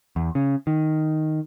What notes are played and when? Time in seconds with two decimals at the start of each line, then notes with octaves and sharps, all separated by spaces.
0.16 E2
0.35 C#3
0.67 D#3